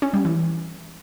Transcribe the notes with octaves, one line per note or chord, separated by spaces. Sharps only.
C#4
G3
E3